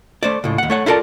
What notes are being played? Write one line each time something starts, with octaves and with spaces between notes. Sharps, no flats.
A3 C5 D5
C#2 A2
D#2 F#5
A3 C#5 F#5
E4 F4 A4 A#4 D5 A5